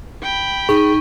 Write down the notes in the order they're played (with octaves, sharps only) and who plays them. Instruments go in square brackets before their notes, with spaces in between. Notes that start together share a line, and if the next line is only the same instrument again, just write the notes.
[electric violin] G5 B5
[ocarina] D#4 [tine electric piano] G#4 [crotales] C#6